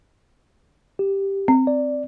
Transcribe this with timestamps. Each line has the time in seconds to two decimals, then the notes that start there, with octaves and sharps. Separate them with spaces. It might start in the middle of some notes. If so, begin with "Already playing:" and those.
0.99 G4
1.48 C4
1.67 D5